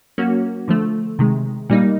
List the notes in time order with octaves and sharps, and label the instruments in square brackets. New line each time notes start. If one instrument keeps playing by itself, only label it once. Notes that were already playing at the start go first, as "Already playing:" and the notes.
[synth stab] F#3 A#3 C#4 F#4
D3 F3 A3
C3 D#3 G#3
A#2 G3 A#3 D#4